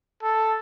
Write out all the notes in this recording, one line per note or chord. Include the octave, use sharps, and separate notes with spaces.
A4